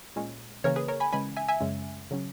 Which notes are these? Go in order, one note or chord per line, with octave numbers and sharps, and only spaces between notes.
A#2 G#3 C#4
C#3 E3 A#3 C#4 A#4 C#5
G#4 B4
A#4 C#5
G#5 B5
C#3 E3 G#3 C#4 G#5 B5
E5 G#5
E5 G#5
F#2 C#3 G#3 C#4
C#3 F#3 C#4